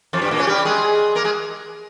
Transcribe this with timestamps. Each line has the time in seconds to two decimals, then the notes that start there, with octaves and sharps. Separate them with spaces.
0.13 F2 F3
0.22 G2 G3
0.31 A#2 A#3
0.39 C#3 C#4
0.47 G3 G4
0.65 G#3 G#4
1.15 A#3 A#4
1.24 G#3 G#4